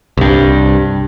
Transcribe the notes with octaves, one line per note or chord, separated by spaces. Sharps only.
C2 G2